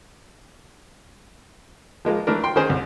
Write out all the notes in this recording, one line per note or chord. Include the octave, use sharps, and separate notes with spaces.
F3 G#3 A#3 F4
E3 A3 D4 A#4
G5 C6
D#3 C#4 G#4 C5
C2